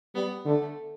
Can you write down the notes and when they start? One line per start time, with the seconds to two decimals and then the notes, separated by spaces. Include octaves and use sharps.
0.15 G3 B3
0.45 D3 A3